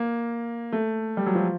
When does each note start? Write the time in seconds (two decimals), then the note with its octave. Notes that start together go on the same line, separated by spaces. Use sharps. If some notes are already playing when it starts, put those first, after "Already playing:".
Already playing: A#3
0.72 A3
1.17 G3
1.26 F#3
1.35 F3